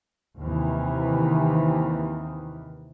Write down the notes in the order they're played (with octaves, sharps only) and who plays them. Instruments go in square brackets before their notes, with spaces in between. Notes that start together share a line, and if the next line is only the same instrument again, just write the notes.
[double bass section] D#2 C3 D#3 E3